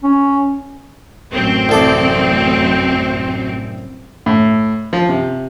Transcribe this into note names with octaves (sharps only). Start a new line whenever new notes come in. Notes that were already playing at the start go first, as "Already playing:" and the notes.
C#4
A1 F#2 C4
C2 A4 D6
A2
F3
C3